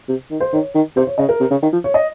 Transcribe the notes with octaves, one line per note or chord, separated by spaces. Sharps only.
C3
D#3
C5
D#3 C#5
D#3
C3 C5
C#5
C#3 D#5
A#4
C3
C#3
D#3
F3
C#5
D#5